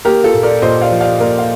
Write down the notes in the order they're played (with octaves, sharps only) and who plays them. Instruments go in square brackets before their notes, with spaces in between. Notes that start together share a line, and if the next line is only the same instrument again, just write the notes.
[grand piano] A#3 G4 A#4
F4 A4
A#2
A#4 D5
A#2 C5 D#5
D5 F5
F3
D5 F5
A#3 A#4 D5
F5